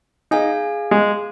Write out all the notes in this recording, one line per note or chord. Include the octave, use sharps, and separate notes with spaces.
D#4 G#4 F5 G#5
G#3